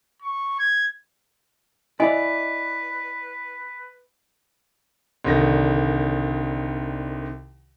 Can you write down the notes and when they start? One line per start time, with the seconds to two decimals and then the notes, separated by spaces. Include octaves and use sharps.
0.22 C#6
0.59 G#6
2.00 E4 B4 D5 D#5 G#5 B5
5.24 C2 D3 D#3 A#6